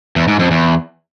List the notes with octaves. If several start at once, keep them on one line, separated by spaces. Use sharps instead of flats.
E2
G#2
F2
E2